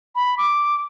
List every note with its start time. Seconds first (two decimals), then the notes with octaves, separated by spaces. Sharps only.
0.15 B5
0.38 D6